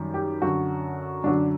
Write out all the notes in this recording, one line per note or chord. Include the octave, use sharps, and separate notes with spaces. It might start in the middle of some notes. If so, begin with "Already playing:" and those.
Already playing: F#2 D#3 G3
G4
F#2 D3 F#3 F#4
F#2 D3 F#3 D4